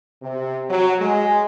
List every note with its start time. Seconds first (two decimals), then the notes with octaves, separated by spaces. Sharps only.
0.23 C3
0.70 F#3
1.01 G#3